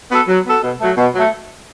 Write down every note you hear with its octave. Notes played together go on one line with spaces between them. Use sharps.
B3 F#4 A4
F#3
B3 F#4 A4
B2
F#3 A3
B2
F#3 A3